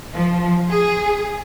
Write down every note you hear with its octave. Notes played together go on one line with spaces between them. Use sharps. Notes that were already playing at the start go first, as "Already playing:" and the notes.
F3
G#4